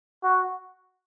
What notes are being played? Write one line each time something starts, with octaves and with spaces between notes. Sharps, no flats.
F#4